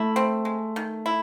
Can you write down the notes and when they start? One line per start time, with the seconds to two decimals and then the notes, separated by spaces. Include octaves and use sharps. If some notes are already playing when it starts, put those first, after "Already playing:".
Already playing: A3 E4
0.16 C4
0.45 G#3
0.76 D#3
1.06 E4